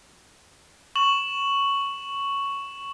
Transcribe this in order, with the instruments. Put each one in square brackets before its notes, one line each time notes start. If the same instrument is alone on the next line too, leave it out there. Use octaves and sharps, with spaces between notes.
[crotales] C#6 E7 F#7